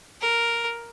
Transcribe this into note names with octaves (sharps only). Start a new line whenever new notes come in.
A#4